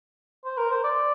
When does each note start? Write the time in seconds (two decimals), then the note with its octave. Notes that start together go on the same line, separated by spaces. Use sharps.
0.45 C5
0.58 A#4
0.71 C5
0.84 D5